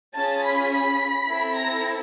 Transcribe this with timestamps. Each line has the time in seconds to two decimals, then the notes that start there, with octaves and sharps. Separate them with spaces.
0.15 C#4 F4 G#4 A5 A6
0.44 B5 B6
0.72 B5 B6
1.29 C4 E4 A4
1.57 A#5 A#6